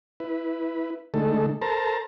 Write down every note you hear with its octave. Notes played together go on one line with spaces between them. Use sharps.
E4 B4
D3 G#3 A3 D#4 A4
A4 A#4 C5 A5 A#5